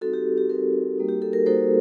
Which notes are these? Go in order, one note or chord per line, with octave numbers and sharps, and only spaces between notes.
G3 C4 D#4 F#4 A4
G4
G4
G3 C4 D#4 G4 A#4
G3 A#3 D#4 F#4
G4
A4
A#4
G3 A#3 D#4 F#4 A4 C5